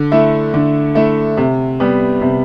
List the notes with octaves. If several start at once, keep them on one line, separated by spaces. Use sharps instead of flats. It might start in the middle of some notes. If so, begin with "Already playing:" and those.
Already playing: D3
A3 E4
D3
A3 E4
C3
G3 B3
C3